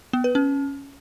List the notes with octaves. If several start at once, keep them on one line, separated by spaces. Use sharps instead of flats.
B3
B4
C#4